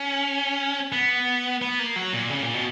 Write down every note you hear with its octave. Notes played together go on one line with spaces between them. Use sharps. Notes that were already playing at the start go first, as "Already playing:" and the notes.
Already playing: C#4
B3
B3
A#3
F#3
A#2
C#3
A#2
B2